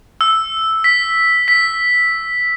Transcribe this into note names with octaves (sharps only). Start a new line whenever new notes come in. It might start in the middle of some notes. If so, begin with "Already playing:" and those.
E6
B6
B6